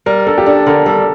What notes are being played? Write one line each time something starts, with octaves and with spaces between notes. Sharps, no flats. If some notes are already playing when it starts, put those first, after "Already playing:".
G3 A#4
D4 A4
G4
D4 A4
D3 A#4
G3 A4